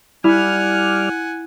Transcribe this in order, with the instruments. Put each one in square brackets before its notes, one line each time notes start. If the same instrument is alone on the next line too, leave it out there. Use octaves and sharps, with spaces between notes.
[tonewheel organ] G3 D5 F6 [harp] E4 [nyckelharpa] F#5 G#5